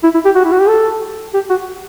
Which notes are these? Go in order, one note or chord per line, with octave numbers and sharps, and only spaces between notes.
E4
E4
G4
F#4
E4
F#4
G4
A4
G4
F#4